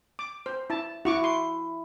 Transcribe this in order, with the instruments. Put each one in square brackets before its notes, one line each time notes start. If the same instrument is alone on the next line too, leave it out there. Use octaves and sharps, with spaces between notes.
[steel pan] D6
C5
E4 A5
[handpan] E4 [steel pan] F#4 C#6 D6
[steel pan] C6